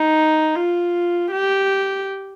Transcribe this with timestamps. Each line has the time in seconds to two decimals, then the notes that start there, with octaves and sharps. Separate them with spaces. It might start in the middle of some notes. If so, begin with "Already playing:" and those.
Already playing: D#4
0.56 F4
1.32 G4